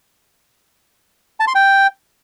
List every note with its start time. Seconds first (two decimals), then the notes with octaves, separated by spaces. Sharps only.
1.40 A5
1.47 C6
1.55 G5